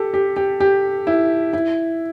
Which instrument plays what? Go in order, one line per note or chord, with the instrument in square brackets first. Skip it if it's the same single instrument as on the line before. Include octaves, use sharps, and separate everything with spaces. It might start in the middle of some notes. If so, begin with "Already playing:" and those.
Already playing: [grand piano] G4 A4
G4
G4
G4
E4
E4